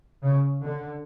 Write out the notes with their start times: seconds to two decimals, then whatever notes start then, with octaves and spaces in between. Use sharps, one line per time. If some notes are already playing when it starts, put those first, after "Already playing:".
0.23 C#3
0.62 D3